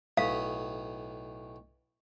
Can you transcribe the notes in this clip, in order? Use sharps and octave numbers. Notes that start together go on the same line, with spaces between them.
B1 A2 F5 D#6